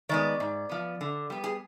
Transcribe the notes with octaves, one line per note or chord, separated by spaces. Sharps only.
D#3 G#3 B3 D5
G#2
F3 B3
D3
G3 B3
G#4